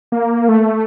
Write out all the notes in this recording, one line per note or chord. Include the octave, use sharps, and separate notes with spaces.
A#3
A3